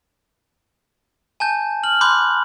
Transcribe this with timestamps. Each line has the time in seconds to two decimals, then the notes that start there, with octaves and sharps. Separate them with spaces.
1.40 G#5 A5 G6
1.83 F6 F#7
2.01 B5 C6 D6 F#6 G6